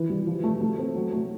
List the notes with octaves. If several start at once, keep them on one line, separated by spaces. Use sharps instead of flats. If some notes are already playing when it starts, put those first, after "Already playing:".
Already playing: E3
G3
F3
A3
A3
C4
F#3
A3